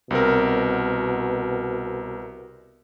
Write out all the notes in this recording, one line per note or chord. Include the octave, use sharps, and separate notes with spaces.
C2 B2 C4 A#4